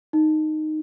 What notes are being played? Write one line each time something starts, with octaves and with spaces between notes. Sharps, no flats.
D#4